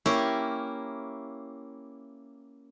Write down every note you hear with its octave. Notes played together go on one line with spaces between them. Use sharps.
A#3 C#4 E4 G4 A#4